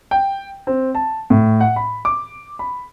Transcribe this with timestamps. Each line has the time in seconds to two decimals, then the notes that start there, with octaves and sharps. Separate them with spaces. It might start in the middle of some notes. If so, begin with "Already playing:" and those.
0.11 G5
0.67 C4
0.95 A5
1.30 A2
1.61 F#5
1.76 B5
2.05 D6
2.59 B5